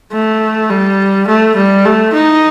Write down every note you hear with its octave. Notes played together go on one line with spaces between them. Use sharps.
A3
G3
A3
G3
A3
D#4